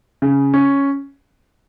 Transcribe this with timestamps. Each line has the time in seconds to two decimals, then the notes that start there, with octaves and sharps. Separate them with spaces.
0.22 C#3
0.54 C#4